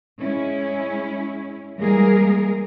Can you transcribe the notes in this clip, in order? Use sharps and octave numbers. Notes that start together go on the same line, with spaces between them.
G#3 C#4 E4
E3 G3 G#3 A#3 G#4 A#4